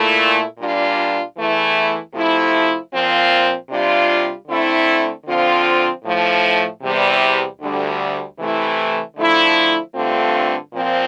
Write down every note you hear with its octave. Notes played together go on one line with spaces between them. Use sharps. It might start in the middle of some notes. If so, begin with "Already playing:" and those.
Already playing: A#2 A3 E4
A#2 G3 D4 F4
E2 E3 A3 E4
C3 F3 A3 E4
A#2 F3 C4 F4
C3 G3 D4 F4
D3 A3 C4 E4
D3 F3 C4 F4
A2 F3 A3
E2 C3 G3
D2 D3 G3
C3 E3 A3 E4
D3 F3 A3 E4
G2 D3 A3 C4 F4
A#2 F3 C4 F4